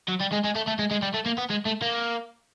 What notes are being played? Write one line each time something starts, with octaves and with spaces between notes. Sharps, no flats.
F#3
G3
G#3
G#3
A3
A3
G#3
G#3
G3
A3
A#3
B3
G#3
A3
A#3